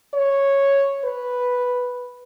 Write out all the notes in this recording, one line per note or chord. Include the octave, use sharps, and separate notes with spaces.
C#5
B4